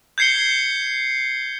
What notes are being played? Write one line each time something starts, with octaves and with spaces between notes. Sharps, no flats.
G6 G#6 C7 C#7 G7